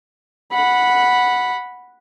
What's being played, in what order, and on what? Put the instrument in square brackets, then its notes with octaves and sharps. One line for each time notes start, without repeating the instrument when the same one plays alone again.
[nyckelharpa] F#5 B5